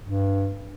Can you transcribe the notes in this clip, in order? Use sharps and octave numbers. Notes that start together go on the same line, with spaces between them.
G2